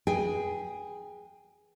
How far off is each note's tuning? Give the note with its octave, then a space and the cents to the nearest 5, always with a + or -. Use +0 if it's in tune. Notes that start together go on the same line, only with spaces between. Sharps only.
G#4 +0 B4 -25 G5 +15